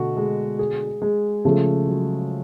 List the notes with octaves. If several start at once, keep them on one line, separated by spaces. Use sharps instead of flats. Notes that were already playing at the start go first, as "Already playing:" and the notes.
Already playing: B2 D3 A3 F#4
G#3
G#4
G#3
C#3 F3 A3
F#3